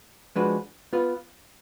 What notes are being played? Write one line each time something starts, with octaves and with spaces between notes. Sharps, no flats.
F3 G#3 D4 F#4 B4
B3 F4 B4